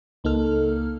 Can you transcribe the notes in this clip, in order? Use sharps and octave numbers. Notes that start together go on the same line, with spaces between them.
C#2 A#3 D#4 A4 F6